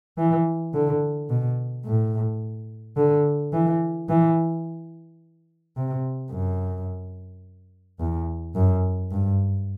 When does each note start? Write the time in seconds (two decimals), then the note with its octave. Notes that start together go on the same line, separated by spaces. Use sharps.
0.18 E3
0.74 D3
1.30 B2
1.85 A2
2.97 D3
3.53 E3
4.09 E3
5.77 C3
6.32 F#2
8.00 E2
8.55 F#2
9.11 G2